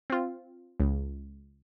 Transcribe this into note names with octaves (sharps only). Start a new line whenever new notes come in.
C4 F4
C#2